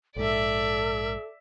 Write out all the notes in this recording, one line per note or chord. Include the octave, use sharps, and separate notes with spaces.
A#1 G#2 A4 D5 E5